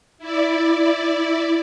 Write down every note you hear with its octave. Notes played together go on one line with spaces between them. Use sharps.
E4 D5